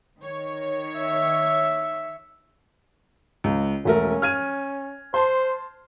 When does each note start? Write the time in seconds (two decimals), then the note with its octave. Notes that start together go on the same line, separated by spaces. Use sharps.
0.19 D#3 C#5
1.00 E5
3.44 C#2
3.85 E1 A3 C#4 A#4
4.22 F6 G#6 D#7
5.14 C5 A5 C6